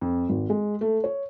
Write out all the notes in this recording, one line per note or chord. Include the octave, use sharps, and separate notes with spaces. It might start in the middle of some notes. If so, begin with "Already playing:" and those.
F2
G#1
G#3
A3
C#5